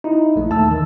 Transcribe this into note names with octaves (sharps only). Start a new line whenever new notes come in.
D#4 E4
A#1 A3
D#2 A5 E6
D#3